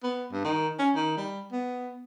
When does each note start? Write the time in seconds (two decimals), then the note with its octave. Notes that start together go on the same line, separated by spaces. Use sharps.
0.03 B3
0.32 G2
0.45 D#3
0.79 C#4
0.95 D#3
1.17 G3
1.52 B3